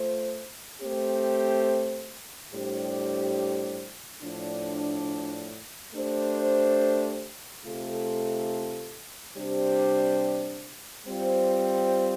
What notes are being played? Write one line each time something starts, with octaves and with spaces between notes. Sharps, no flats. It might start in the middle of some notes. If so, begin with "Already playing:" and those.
Already playing: A3 F4 C5
A3 C4 G4 C5
A2 G3 D4 G4 C5
A2 F3 D4
A3 D4 G4 C5
C3 A3 F4 A4
C3 G3 D4 G4 C5
G3 C4 F4 C5